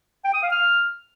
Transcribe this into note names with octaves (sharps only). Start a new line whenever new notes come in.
G5
D#6
F5
F6